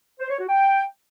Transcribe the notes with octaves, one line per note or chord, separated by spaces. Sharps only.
C5
C#5
F#4
G5